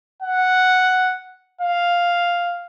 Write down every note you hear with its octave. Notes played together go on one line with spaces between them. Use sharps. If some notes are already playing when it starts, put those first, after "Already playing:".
F#5
F5